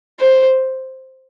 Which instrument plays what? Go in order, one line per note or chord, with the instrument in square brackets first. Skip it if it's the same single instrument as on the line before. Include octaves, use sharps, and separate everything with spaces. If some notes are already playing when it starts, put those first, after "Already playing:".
[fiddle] C5